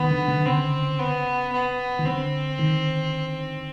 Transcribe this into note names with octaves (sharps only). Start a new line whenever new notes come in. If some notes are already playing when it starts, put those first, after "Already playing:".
Already playing: D#3 B3
D3
D3
C#3 C4
B3
B3
D#3
D3 C4
D#3